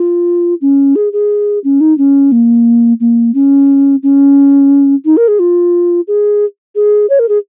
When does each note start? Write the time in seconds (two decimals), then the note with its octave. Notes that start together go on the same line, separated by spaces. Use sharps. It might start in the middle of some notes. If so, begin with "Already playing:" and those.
Already playing: F4
0.61 C#4
0.96 G#4
1.13 G#4
1.64 C#4
1.81 D#4
1.98 C#4
2.32 A#3
3.00 A#3
3.34 C#4
4.03 C#4
5.05 D#4
5.17 A#4
5.28 G#4
5.39 F4
6.08 G#4
6.76 G#4
7.10 C#5
7.19 A#4
7.29 G#4